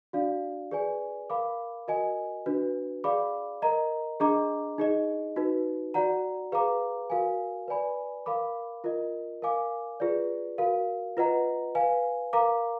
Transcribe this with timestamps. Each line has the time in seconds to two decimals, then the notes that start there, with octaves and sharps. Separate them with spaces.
0.13 D4 F#4 D5 F5
0.71 G#4 B4 D5 G#5
1.30 A#4 F5 B5 D6
1.88 F#4 A#4 D#5 G#5
2.46 D4 F#4 B4
3.04 G#4 D5 F5 B5 D6
3.62 A#4 D#5 A#5
4.20 D4 G#4 D#5 A#5 D6
4.78 D#4 G#4 D#5
5.36 D#4 F#4 B4
5.94 F#4 D5 F#5 A#5
6.52 G#4 B4 F5 A#5 D6
7.10 F#4 A#4 F5 G#5
7.68 B4 D5 G#5 B5
8.26 A#4 F5 B5 D6
8.84 F4 A#4 D#5
9.42 A#4 F5 G#5 D6
10.00 F4 G#4 B4 D5
10.58 F#4 A#4 F5
11.17 F4 B4 D#5 F#5 A#5
11.75 B4 F5 G#5
12.33 A#4 F5 A#5 D6